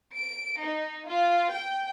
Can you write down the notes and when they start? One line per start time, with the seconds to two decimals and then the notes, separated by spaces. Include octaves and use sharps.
0.15 D7
0.62 D#4
1.09 F4
1.50 G5